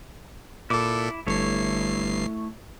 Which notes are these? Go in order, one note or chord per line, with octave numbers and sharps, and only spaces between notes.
A#2 E4 A4 D6
G1 G2 A3 E4 C#5 C7